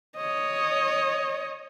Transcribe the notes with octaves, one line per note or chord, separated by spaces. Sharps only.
C#5 D#5